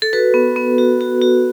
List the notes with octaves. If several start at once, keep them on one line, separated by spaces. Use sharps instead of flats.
A4
F#4 B4
B3
B3
F#4
F#4
F#4